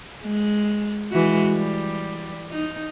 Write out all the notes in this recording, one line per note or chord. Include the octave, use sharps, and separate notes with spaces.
G#3
E3 G#3 F#4
G3
D#4